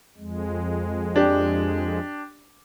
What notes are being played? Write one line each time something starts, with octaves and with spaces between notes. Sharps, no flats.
F2 G#3
D4 G4